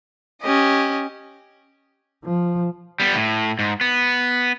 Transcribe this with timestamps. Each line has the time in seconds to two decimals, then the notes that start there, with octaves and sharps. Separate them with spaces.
0.42 C#4 G4 D#5
2.24 F3
3.00 G3 B3
3.14 A2
3.59 G#2
3.81 B3